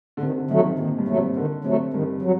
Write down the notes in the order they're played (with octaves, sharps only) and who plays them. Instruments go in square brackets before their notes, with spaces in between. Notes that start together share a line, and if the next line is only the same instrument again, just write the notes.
[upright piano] D3
[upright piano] C3 [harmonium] D#3
[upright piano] D3
[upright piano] D#3 [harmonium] F#3 A3
[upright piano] C3
[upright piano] A#2 [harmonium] D#3
[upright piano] G2
[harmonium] F#3 A3
[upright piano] C3
[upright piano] D3 [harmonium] D#3
[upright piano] C3 [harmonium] F#3 A3
[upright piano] G2 [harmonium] D#3
[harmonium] F#3